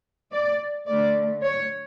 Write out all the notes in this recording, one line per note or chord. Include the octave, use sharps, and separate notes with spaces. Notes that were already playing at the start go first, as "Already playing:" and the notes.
D5
D3 A3 D5
C#5